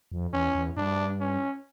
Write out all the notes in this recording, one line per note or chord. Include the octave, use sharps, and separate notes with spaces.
F2
E2 C#4
E2
G2 D4
C#4